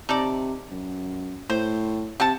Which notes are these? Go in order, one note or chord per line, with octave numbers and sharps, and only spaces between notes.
C3 D#4 A4 D5
F#2
A2 C5
C3 C4 F#5 A5